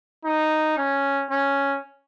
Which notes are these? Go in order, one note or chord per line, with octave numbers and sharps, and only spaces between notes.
D#4
C#4
C#4